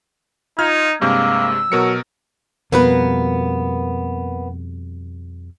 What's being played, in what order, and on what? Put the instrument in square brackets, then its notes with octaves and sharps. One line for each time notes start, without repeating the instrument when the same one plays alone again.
[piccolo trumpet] D#4 [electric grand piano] F4 F6 G#6
[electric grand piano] G2 C3 G#3 [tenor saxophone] A#3 [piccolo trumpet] E6
[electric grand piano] B2 A#4 C#7 [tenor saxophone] F#3
[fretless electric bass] F2 B2 G3 [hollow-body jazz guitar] A#3 B3 B4